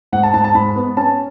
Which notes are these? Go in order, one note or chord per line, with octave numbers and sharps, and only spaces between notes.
G#2 F#5
A5
G#2 A5
A5
G#2 B5
B3
C#4 A5